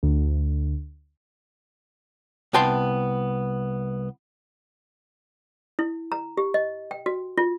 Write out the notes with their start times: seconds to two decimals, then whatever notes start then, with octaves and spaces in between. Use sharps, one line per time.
0.03 D2
2.53 C2 B3 G5 A5 C6
5.79 E4
6.12 A#5
6.37 G4
6.54 D#5
6.91 G5
7.06 F#4
7.38 F4